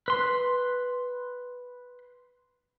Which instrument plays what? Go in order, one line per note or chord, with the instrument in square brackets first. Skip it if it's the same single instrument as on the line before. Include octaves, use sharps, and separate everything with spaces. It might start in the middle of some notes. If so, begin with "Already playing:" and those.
[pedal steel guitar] B4 C6